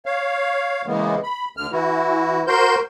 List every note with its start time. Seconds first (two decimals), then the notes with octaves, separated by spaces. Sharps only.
0.06 C#5 F5
0.86 C#3 E3 G#3 A#3 B3
1.23 B5
1.57 D2 D3 F6
1.72 E3 E4 F#4
2.47 F#4 A#4 C5 C6 G6